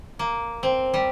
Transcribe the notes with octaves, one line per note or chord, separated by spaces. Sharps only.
A#3
C4
G3